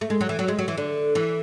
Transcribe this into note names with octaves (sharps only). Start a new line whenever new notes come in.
A3
G#3
F#3
E3
F#3
G#3
F#3
E3
D3
E3